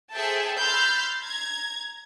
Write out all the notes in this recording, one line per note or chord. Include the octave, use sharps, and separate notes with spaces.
G#4 A4 C5 E5 G5 A5
B5 C6 E6 F6 G6 A6
A#5 G#6